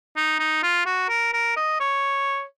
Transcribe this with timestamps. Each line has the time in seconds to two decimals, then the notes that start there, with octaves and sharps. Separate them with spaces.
0.16 D#4
0.39 D#4
0.63 F4
0.86 F#4
1.09 A#4
1.34 A#4
1.57 D#5
1.80 C#5